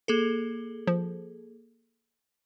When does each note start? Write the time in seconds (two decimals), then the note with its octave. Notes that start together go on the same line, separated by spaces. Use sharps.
0.08 A#3 G#4 A4
0.87 F3